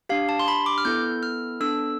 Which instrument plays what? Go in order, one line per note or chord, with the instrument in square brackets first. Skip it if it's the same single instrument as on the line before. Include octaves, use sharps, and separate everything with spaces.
[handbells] D4 G4 F5
A5
C6
B5
D6
F6
B3 E4 A4 G6
F6
B3 D4 A4 E6